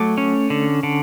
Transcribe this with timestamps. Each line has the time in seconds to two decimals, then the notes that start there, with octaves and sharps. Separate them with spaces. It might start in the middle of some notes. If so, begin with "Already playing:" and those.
Already playing: F#3 A3 D6
0.18 C#4
0.50 D3
0.83 D3